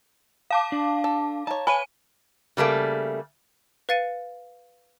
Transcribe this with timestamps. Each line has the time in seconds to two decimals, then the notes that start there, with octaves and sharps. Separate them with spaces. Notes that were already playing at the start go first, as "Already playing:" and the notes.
0.51 F5 A5 D6
0.72 D4
1.04 A4
1.47 D#4 C#5 A5
1.67 B4 C#5 F5 G#5 D#7
2.57 C#3 G3 A3 A#3
3.89 B4 F5 A6 C#7 D#7